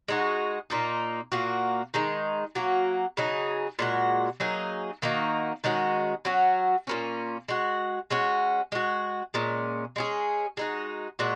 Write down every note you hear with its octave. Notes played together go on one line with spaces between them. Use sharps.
G#3 D#4 F#4
A#2 A#3 D#4
A#2 A#3 F#4
D#3 G#3 D#4
F#3 A#3 F#4
C#3 F#3 D#4 G#4
A#2 G#3 F#4
F#3 A#3 D#4 G#4
D#3 A#3 D#4 F#4
D#3 G#3 C#4 F#4
F#3 C#4 F#4
A#2 A#3 C#4
G#3 F#4
G#3 C#4 F#4
G#3 F#4
A#2 G#3 C#4
G#3 C#4 G#4
G#3 D#4 F#4
A#2 G#3 F#4